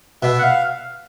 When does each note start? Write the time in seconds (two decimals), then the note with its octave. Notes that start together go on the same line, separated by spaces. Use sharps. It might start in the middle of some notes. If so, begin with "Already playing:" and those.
0.23 B2 E5
0.38 F#5
0.42 F5